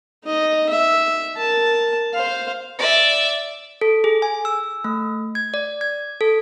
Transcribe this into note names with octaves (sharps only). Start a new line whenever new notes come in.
D#4 D#5
E5
A#4 A5
C5 F5
D5 E5
A4
G#4
G#5
E6
A3
G#6
D5
G#6
A4